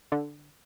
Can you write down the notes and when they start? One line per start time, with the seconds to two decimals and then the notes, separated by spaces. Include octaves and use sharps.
0.12 D3